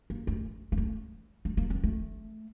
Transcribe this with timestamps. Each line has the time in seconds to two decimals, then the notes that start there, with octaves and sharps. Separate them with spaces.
0.10 A#3
0.27 A3
0.72 A#3
0.78 A3
1.45 A3
1.57 A#3
1.70 C4
1.84 A3